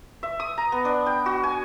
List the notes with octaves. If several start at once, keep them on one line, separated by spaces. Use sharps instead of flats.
E5
D#6
A#5
B3
D4
G5
F#4
G#5